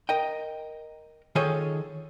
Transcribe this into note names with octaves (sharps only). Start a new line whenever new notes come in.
A#4 D#5 G5
D#3 F4 G#4 A4 C#5 D#5